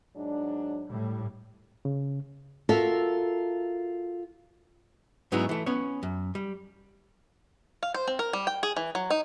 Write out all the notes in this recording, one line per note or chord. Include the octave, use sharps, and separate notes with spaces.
G#2 F#3 D4
A2 G3
C#3
F4 F#4 A4 A#4 E5
G#2 F#3 B3 C#4 D#4 E4
E3 A3
B3 C#4 C#5
F#2
G3
F5
C5
C4
A#4
G3
G5
G#4
E3
F#3
D#4